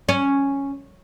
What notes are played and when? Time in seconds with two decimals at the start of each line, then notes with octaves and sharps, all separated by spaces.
0.09 C#4